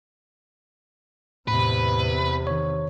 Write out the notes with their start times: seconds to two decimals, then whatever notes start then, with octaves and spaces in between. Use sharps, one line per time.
1.48 E2 A2 C3 B4
2.47 D#3 C#5